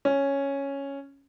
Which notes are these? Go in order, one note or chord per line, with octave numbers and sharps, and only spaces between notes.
C#4